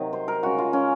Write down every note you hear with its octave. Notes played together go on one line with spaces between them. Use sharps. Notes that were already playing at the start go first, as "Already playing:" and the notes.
Already playing: C3 D#3 F#3
C5
A#4
C#3 G#3 F#4
F4
C#4